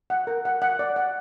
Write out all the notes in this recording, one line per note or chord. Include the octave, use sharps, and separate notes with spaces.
F#5
A#4
F#5
F#5
D5
F#5